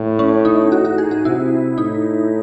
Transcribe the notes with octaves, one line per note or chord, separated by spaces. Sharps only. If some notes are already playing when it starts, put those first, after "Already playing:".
Already playing: A2
C#4
D#4
F#4
F#4
G#4
F#4
C3 E4
A2 D#4